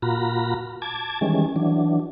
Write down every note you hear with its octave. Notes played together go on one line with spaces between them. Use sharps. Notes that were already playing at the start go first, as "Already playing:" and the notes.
A#2 F4 F#4 A#5 B5
A5 D6 G#6
D#3 E3 G3 G#3 C#4
E3 F#3 D4